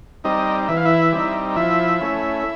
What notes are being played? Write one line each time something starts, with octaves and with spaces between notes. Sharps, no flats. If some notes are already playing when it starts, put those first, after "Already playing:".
G3 C4 D#4 D#5
E3 E5
F5
E4 E5
G3 C4 D#4
F3 E4 E5
A3 C#4